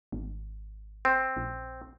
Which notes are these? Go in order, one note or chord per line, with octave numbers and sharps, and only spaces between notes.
G#1
C4
A#1